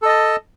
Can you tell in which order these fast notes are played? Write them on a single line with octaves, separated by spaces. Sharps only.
A4 D#5 A5